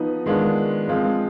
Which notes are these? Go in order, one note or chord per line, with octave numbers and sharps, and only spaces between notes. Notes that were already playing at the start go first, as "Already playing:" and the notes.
Already playing: F3 B3 D#4
D#3 G#3 B3 D4 F4
F3 G#3 C4 F4